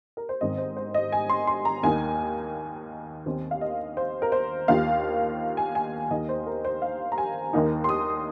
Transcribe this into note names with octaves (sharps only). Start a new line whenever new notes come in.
A#4
C5
G#2 D#3 C4 D#5
C5
C5
D#5
G#5
C6
C6
A#5
D#2 D#3 A#3 D#4 G#5
D#2 D#3 C4
F5
D#5
C5
A#4
C5
D#2 D#3 A#3 F4 F5
G#5
G#5
D#2 D#3 A#3 D#4 D#5
C5
A#4
C5
F5
A#5
G#5
D#2 D#3 A#3 D#4
C6
D#6